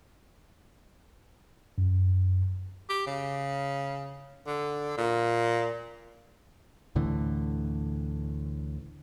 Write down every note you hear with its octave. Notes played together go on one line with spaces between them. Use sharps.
F#2
G4
C#3
D3
A#2
D2 A2 D3 E3